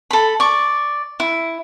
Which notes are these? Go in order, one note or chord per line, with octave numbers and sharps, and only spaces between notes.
A4 B5
D5 C#6
E4